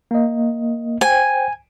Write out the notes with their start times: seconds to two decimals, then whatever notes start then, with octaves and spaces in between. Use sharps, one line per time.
0.11 A#3 D#5
1.01 C5 G5 G#5